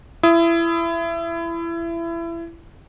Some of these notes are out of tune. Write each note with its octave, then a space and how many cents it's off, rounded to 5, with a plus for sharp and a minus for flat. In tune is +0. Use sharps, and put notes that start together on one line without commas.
E4 +25 D#6 +25